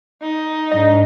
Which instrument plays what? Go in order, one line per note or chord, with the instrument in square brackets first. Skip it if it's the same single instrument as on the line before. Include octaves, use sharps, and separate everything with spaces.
[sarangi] D#4
[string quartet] G#2 D4 [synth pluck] D#5